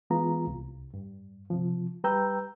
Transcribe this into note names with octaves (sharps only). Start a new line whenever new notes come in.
E3 G#3 B3 F4 A#5
C2
G2
C3 F3
G3 B4 G5 A#5 E6 G6